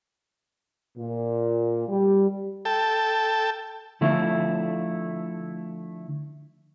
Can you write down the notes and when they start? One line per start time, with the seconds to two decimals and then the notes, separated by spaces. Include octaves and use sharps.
0.98 A#2
1.88 G3
2.65 A4 G5 A5
4.01 D3 F3 A3 E4